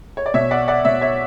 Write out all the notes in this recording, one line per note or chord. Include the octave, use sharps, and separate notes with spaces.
C#5
D5
B2 C#5 E5
D5 F#5
D5 F#5
B2 C#5 E5
C#5 E5